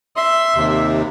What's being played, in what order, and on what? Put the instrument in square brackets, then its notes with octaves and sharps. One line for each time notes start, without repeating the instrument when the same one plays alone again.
[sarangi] E5 [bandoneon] C6
[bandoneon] D#2 C3